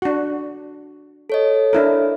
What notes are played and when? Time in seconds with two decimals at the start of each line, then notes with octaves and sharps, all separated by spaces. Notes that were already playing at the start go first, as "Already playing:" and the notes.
0.02 D4 F#4
1.30 A4 C#5 D#5
1.73 D4 E4 A#4